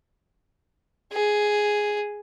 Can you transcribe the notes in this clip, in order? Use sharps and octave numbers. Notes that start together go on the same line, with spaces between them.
G#4